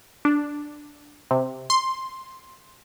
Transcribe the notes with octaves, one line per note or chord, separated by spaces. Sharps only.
D4
C3
C6